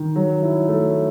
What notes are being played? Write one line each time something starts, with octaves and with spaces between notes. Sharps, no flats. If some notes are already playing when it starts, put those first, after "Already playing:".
Already playing: D#3
F#3
E4
A3